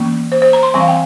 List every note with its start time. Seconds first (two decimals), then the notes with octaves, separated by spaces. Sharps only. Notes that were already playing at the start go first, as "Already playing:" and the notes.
Already playing: E3 A#3 C#4
0.32 C5
0.42 C5
0.53 A#5
0.63 C6
0.74 E3 G3 C4 G#5
0.80 F5
0.88 G5